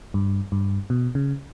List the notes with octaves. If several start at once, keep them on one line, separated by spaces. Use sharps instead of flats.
G2
G2
B2
C#3